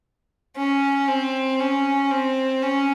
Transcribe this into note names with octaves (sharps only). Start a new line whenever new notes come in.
C#4
C4
C#4
C4
C#4